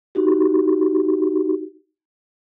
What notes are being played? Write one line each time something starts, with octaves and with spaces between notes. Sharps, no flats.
D#4 F#4 G4